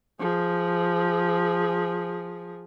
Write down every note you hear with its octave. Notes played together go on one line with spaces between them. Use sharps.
F3 G#4